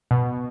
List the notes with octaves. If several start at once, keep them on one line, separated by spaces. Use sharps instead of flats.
B2